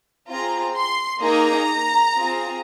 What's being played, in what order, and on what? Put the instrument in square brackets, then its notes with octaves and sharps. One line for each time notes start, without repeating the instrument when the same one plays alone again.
[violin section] C4 F4 G#4 A#5
C6
A#3 D#4 G#4 A#5
C4 F4 G#4